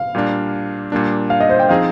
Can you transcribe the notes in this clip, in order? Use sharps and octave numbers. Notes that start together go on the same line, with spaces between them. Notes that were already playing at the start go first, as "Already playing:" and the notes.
Already playing: F5
A#2 G3 A#3 D4
A#2 G3 A#3 D4
F5
D#5
C5
G5
F3 C4 D#4 G#4 F5